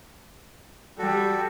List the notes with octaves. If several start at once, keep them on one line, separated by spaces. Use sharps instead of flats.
G3 F#4 A4